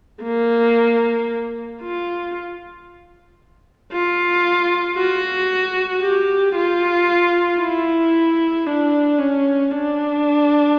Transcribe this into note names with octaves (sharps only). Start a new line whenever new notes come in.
A#3
F4
F4
F#4
G4
F4
E4
D4
C#4
D4